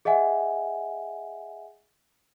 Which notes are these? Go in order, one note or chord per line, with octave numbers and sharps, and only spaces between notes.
G#4 D#5 E5 F#5 G#5